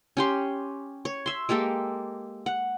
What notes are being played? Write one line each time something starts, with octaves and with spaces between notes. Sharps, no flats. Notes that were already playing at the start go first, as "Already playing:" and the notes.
C#4 G4 C6
C#5
E5 C6
G#3 A#3 G4 A4
F#5